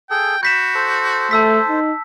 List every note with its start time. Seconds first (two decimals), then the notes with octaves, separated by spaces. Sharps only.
0.10 G#4 A4 G5
0.43 F#4 B5 G6 B6 E7
0.75 A4 C5
1.31 A3 A5 E6 B6
1.69 D#4